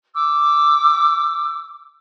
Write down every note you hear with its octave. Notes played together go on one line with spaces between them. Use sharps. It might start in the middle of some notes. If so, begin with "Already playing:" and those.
D6 E6